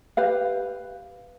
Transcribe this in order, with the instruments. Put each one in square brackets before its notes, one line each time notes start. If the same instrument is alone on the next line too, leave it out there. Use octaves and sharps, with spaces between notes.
[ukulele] G4 B4 F5